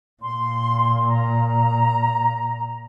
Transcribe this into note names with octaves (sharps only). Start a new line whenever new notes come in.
A#2 C6
A#5